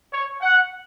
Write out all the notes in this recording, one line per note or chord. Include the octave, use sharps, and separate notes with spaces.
C#5
F#5